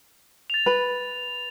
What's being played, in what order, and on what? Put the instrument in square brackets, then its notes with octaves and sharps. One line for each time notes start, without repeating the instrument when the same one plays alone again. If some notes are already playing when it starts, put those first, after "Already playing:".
[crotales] A6 F7
[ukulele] B4